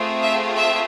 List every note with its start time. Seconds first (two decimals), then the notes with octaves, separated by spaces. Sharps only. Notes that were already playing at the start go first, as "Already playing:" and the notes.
Already playing: A3 C4 F4 G#4
0.22 E5
0.55 E5